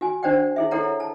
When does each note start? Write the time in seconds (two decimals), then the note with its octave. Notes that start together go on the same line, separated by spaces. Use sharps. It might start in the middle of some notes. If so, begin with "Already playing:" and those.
0.01 F#4 G#5
0.23 D4 C5 D5 F#5 G5
0.56 E4 G#4 E5
0.71 E4 G4 A4 C#5 F#5 A#5
1.00 A5